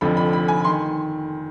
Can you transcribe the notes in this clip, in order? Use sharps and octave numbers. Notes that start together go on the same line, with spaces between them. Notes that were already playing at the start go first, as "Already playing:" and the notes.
F1 F2 D3 F3 B5
B5
B5
G#5
D#3 C6